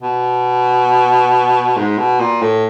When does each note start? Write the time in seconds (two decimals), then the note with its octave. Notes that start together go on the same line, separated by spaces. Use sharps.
0.02 B2
1.77 G#2
1.98 B2
2.20 A#2
2.42 A2